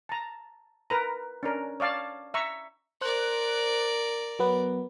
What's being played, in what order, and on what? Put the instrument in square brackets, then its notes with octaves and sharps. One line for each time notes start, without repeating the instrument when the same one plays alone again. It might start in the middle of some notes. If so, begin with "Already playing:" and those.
[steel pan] A5 A#5
A#4 B4 A#5
C#4 D4 A#4
C#5 D5 F5 A5
E5 A#5 C#6
[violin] A#4 D5 [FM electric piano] C5 F#6
[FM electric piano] F#3 B3 B4